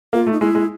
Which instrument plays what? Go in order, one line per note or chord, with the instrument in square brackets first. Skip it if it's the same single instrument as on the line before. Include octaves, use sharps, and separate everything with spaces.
[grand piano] A#3 [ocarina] F4
[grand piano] A3
[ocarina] D#4
[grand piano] G#3 [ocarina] E4
[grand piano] G#3